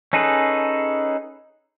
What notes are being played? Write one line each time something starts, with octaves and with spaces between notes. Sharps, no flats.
C#4 D#4 G#4 A4 B4